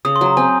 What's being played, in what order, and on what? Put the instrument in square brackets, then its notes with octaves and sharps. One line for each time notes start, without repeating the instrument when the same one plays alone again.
[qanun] C#3 [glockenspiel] D#6
[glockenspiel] C6
[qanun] F#3
[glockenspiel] A#5
[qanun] C4 [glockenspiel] G#5